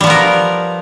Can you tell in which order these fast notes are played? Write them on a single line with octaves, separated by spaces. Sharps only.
G3 F3 B3 A#4